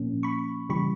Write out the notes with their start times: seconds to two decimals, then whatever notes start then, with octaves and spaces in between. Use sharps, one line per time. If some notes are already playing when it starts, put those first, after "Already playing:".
Already playing: A#2 F3 A#3 C#4
0.23 B5 C#6
0.70 C#3 E3 G3 B5 C#6